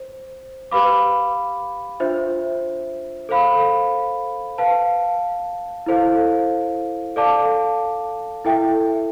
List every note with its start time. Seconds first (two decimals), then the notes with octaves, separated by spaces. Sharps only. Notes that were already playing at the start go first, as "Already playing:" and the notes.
Already playing: C5
0.71 G4 B4 F5 B5 D6
2.00 D4 F4 C5 E5
3.29 A4 C5 F5 B5
4.58 B4 F5 A5
5.86 E4 A4 C5 F5
7.16 A4 D5 F5 A5 D6
8.45 E4 A4 E5 G5